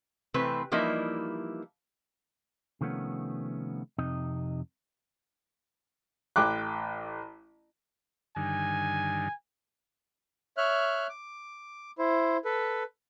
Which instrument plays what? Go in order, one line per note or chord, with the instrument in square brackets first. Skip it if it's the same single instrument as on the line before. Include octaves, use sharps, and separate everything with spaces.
[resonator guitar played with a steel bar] C3 E3 A3 C4 B4
E3 F3 G3 A#3 D#4 E4
[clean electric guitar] C3 D#3 F3 A3 B3 C#4
F2 C3 D#4 D#5
[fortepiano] A1 G5 D6 F#6
[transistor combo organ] G2 D3 D#3 [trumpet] G#5
[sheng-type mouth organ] C#5 E5 F6 F#6
D6
E4 C5
A4 B4